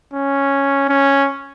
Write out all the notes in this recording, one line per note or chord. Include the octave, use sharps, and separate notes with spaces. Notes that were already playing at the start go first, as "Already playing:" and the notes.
C#4
C#4